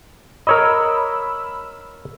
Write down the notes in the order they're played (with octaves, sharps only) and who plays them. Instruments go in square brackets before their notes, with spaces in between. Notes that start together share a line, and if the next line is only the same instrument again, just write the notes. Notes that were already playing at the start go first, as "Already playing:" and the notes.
[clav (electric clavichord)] A#4 C#5 D#5 [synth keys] B5 E6